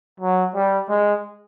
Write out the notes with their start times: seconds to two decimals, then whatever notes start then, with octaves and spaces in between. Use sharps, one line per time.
0.20 F#3
0.55 G3
0.89 G#3